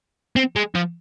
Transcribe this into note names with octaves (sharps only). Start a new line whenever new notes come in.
C4
G#3
F3